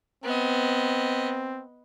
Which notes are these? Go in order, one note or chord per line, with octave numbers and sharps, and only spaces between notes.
B3 C4 D#5